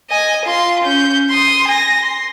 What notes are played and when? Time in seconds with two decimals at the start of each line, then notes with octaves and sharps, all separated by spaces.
0.10 D#5 G#5
0.45 F4 C6
0.84 C#4 G6
1.30 C6 D#6
1.68 G#5 A#6
2.01 C6